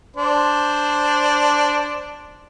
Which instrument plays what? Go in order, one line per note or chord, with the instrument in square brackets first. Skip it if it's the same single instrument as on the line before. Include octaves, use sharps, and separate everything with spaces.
[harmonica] D4 C5